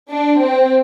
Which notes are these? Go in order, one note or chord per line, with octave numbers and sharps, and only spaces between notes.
D4
C4